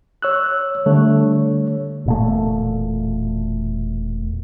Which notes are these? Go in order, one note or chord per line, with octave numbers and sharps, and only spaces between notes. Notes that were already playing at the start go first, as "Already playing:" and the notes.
C#5 E6 F#6
D3 G3 A3 C#5
E1 A#2 A3